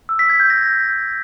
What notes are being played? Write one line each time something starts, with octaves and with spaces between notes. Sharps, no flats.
E6
B6
G#6
G6
A#6